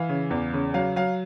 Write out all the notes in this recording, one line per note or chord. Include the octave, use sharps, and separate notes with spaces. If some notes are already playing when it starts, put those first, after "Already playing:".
Already playing: E3 F5
C#3
E2
C#3
F#3 F5
F#3 F5